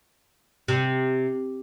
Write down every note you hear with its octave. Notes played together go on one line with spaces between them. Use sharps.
C3